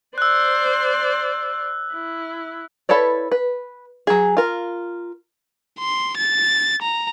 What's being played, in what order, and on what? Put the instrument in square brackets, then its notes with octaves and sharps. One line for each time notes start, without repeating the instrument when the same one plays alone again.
[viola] C5 D5 [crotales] E6 F#6
[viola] E4
[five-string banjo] E4 A4 B4 C#5 D5
B4
F#3 G#4
F4 A#4
[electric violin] C6
A6
A#5